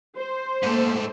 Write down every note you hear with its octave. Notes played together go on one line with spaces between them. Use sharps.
C5
G#2 A3 A#3